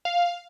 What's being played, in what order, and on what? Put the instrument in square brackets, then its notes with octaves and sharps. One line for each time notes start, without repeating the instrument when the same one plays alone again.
[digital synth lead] F5